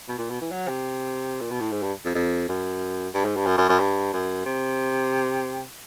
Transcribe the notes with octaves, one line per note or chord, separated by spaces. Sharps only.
B2
A#2
B2
E3
F#3
C3
A#2
B2
A2
G#2
G2
F2
F2
F#2
G2
G#2
G2
F#2
F#2
F#2
G2
F#2
C3